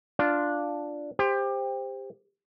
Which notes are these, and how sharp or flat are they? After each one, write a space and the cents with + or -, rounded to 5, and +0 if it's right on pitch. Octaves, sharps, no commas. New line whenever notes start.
D4 +0 F4 +0
G4 +25 C5 +0